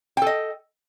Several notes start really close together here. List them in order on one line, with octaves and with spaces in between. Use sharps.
G5 A4 D#5